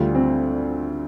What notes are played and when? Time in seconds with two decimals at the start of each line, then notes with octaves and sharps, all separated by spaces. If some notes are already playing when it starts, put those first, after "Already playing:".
Already playing: D2 D3 G3 F4
0.15 C4